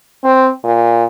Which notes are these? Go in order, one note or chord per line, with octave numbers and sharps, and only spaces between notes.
C4
A#2